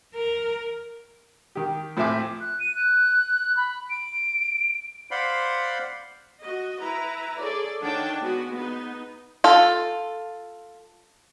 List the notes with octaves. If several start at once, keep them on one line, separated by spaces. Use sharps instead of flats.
A#4
D#3 G4
A2 F3 C4 E5 G#5 D6
F#6
D#7
F#6
B5
D7
C5 D5 F5 F#5 B5 C6
F#4 D#5
E4 B4 A#5
G#4 A4 C#5 D5
D#3 D4 C#5 F#5 G5 A5
G#3 B3 F#4
B3 D#4
F4 A4